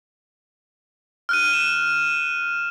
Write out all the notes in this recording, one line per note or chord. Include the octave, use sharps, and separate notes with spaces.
F6 F#6 D#7
E7